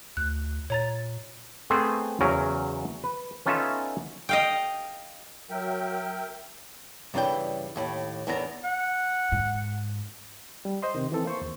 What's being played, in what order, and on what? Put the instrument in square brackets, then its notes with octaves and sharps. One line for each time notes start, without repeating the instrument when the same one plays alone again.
[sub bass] D2 [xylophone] F#6
[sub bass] A#2 [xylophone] C#5 A#5 A6
[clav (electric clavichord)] A3 B3 C4 G#4 C5
E2 C#3 F#3 C#4 A#4
B4
B3 C#4 D#4 F4 A4 E5
[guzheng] D#5 F5 G5
[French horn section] F#3 [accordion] A#4 E5 G5
[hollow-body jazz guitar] G2 C#3 E3 D4 B4 G5
D#2 A2 B5
E2 A2 B3 D4 G4 A#5
[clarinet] F#5
[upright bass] G#2
[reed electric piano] G3
C5 D#5 C6
C3 D#3
E3 C4 A4
A#3 C5 C#6
D#2